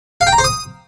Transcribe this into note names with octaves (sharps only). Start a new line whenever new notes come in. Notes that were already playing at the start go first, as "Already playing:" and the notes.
F5
G5
A#5
C5
D#6